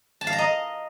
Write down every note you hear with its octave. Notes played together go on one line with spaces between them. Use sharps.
A5
F5
A#5
D#5